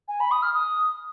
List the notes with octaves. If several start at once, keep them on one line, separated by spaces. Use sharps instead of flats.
G#5
B5
D#6
F6
D#6